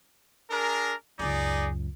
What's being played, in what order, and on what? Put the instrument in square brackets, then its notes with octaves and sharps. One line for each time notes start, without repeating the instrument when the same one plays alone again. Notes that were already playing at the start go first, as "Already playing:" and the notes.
[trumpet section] D4 G#4 A#4
[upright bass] C#2 F#2 [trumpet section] D#4 G#4 D5